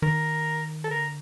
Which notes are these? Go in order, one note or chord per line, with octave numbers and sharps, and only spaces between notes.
D#3 A#4
A4
D3 A#4